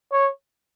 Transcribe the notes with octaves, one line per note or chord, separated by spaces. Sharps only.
C#5